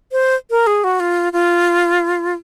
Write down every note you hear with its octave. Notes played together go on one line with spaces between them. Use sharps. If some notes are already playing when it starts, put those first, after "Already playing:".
C5
A#4
G#4
F#4
F4
F4